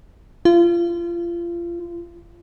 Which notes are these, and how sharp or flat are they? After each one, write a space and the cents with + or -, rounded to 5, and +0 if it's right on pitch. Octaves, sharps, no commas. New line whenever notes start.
F4 -30